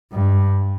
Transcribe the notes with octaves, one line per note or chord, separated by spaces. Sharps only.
G2